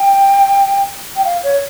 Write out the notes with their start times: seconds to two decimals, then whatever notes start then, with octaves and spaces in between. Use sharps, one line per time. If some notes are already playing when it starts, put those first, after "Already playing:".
Already playing: G5
1.16 G5
1.25 F5
1.43 C#5